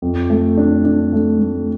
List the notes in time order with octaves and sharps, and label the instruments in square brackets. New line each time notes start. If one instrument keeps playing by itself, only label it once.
[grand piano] F2
A3
D4
D4
A3
A3